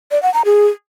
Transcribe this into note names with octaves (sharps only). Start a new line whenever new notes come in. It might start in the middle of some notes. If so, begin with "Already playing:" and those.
D5
F#5
A#5
G#4